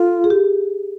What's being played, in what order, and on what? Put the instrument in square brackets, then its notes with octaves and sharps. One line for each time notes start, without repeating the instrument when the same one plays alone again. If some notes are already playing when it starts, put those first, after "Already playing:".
Already playing: [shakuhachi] F4 [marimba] A4
[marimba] G#4
G4